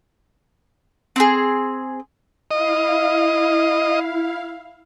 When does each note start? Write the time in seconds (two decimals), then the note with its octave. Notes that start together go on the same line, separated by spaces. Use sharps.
1.16 C4 E4 G#4
2.51 E4 D#5 F5